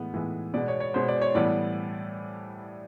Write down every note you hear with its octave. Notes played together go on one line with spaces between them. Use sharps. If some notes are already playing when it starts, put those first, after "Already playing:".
Already playing: A2 E3 G#3 B3
A2 E3 G#3 B3
B2 G#3 B3 D5
C#5
C#5
B2 G#3 B3 C5
D5
C#5
A2 E3 G3 B3 D5